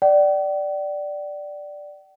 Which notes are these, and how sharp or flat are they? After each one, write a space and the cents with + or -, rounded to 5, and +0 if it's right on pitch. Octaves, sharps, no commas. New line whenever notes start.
D5 +0 G5 -45